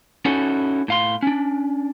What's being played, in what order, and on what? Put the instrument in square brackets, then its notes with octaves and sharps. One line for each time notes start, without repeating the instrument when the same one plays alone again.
[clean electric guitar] C#4 D#4 E4 F#4 A4 C#5
A2 F5 C6
C#4 D4